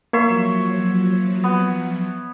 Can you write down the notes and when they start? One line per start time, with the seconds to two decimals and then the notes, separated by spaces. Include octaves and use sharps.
0.13 F3 F#3 A#3 C#5 E5 C6
1.44 B3